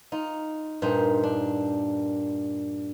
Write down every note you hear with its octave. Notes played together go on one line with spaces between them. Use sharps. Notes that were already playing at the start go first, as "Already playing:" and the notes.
D#4 F4
G2 A#2 D#4 C5
D4